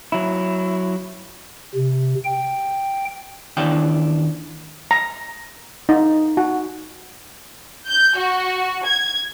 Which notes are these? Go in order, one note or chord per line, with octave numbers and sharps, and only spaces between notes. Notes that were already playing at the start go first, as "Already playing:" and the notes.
F#3 E4
C3
G5
D#2 E3 D4 G5
A#5
D#4
F#4
G6
F#4
G#6